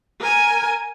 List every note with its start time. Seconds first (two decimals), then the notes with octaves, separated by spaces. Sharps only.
0.20 A#4 G#5